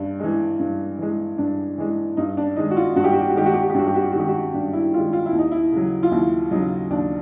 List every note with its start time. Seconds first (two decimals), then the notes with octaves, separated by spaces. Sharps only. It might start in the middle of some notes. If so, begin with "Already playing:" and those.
Already playing: G2 D4
0.20 E3 G#3
0.59 G2
0.99 E3 G#3
1.38 G2 D4
1.78 E3 G#3
2.17 G2 D#4
2.37 D4
2.56 D#3 G#3 D#4
2.71 F#4
2.76 F4
2.96 G2 F#4
3.04 G4
3.13 F#4
3.21 G4
3.29 F#4
3.36 D#3 G#3 G4
3.46 F#4
3.54 G4
3.62 F#4
3.70 G4
3.74 G2 F#4
3.87 G4
3.95 F#4
4.03 G4
4.11 F#4
4.15 D#3 G#3 G4
4.28 F#4
4.54 G2 D4
4.73 E4
4.94 D#3 F4
4.97 G#3
5.13 F4
5.26 E4
5.32 D#2
5.39 D#4
5.51 E4
5.72 C#3 F#3
6.03 F4
6.12 D#2 E4
6.51 C#3 F#3 D#4
6.91 D#2 D4